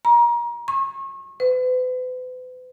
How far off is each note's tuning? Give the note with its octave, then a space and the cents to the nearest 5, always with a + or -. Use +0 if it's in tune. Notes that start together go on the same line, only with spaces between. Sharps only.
A#5 +30
C#6 -35
B4 +40